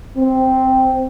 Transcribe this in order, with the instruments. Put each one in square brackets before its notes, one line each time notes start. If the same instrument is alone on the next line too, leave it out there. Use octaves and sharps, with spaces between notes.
[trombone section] C4